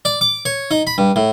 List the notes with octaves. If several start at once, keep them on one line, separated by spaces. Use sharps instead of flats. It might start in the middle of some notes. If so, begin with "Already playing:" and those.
D5
D6
C#5
D#4
B5
G2
A2